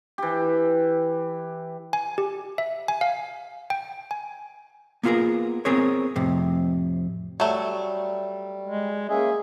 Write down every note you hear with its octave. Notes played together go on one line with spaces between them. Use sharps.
E3 G4
G#5
G4
E5
G#5
F5
G5
G#5
A#3 B3 F4 G4 G#4 A#4
B3 C4 G#4 A#4 C#5
F2 A2 C3
F#3 G3 A3
G#3
A#3 C#4 G#4 E5